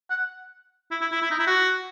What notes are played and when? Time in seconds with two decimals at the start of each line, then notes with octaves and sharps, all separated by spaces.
0.10 F#5
0.91 E4
1.01 E4
1.12 E4
1.22 E4
1.31 D#4
1.39 E4
1.47 F#4